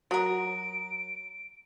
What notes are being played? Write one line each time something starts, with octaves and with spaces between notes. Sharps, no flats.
F#3 A#4 D#6 D7